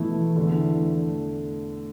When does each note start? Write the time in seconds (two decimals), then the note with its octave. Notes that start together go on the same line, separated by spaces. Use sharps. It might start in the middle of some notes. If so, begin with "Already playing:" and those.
Already playing: B2 E3 A3 E4
0.36 E2 D3 A3